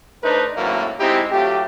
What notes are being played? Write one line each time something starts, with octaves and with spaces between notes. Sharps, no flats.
A3 D4 D#4 B4 C5
G#1 F#2 A2 F#3 A#3
G#3 C4 D#4 E4 G4
F#3 A3 F4 G4